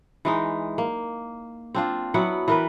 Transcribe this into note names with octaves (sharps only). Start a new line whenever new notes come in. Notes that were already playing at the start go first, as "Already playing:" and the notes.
E3 G#3 D#4
A#3
C4 D4 F4
F#3 B3 E4 F#5
E3 A#4 B4